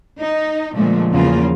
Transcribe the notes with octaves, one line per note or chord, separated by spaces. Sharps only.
D#4
A#2 D3 F3 G#3 A3
E2 C#3 F3 A#3 F4